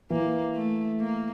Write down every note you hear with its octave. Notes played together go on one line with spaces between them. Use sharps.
E3 A#3
A3
A#3